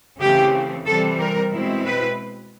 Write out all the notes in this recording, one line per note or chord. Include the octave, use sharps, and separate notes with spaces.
C#3 E3 A3 C4 G4
C3 E3 G3 C4 A4
A#4
B2 G#3 C4 E4
B4